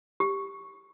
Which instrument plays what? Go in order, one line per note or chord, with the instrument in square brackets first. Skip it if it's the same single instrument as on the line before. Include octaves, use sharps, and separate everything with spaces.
[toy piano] G4